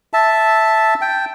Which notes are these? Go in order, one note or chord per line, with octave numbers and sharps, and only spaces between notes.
E5 A5
G5